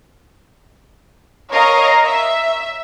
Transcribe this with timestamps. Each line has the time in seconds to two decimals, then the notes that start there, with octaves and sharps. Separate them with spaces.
1.52 A#4 C#5 D#5 F5 A#5
2.07 E5